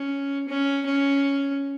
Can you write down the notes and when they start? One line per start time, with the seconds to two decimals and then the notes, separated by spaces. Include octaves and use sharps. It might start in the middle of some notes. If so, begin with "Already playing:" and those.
Already playing: C#4
0.48 C#4
0.86 C#4